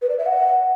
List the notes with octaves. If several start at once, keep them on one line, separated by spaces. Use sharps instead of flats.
B4
D5
E5
F#5